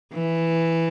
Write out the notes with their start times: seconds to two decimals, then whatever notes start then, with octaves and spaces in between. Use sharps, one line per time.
0.14 E3